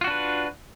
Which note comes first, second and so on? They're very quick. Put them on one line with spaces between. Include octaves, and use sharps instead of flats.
F4 F#4 D4 B4